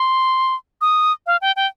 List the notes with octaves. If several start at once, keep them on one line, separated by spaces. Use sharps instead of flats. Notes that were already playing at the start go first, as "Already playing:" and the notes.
Already playing: C6
D#6
F5
G5
G5